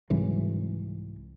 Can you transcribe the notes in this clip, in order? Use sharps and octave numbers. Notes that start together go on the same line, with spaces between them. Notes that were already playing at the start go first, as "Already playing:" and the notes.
C2 G#2 E3 F#3